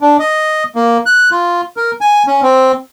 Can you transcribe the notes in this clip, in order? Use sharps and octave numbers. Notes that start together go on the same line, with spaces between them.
D4
D#5
A#3
F#6
F4
A#4
G#5
C#4
C4